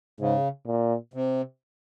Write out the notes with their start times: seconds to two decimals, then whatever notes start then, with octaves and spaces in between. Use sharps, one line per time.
0.20 G#2 C#3
0.66 A#2
1.14 C3